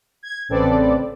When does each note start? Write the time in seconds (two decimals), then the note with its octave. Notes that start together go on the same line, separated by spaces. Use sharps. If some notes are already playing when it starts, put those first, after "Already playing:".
0.23 G#6
0.49 A1 C#3 C4 A4 B4 D5